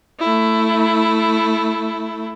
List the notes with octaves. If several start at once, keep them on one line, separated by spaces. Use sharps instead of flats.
A3 E4